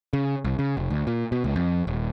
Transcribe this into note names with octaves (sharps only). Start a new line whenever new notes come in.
C#3
C2
C#3
F1
D2
A#2
B2
C#2
F2
D#1